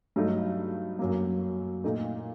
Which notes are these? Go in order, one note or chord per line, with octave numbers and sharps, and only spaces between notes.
G2 F#3 A3 D#4
F#2 F#3 A#3
A#2 A3 D#4 A4